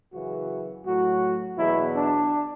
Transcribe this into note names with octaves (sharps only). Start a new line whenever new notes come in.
F#2 C#3 E3 F#4
A2 F#3 F#4
E2 B2 F#3 E4
D4